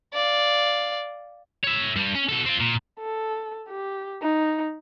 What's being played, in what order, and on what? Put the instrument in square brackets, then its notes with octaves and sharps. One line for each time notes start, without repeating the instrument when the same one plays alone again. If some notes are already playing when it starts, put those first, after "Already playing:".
[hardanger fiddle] D5 F5
[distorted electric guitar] C#5 E5
G2 G3
C#4
B2 A4
C4 F4
A#2
[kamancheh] A4
G4
D#4